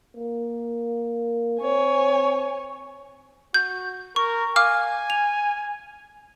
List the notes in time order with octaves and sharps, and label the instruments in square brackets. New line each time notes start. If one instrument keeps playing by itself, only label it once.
[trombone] A#3
[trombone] C4 [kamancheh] C#5 G#5
[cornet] F#4 [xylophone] G6
[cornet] A#4 [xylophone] C#6
[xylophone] F5 D6 F6 [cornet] G#5
[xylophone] F7